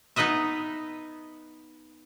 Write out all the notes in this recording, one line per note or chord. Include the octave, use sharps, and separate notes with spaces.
B3 D#4 B4 D#5 E5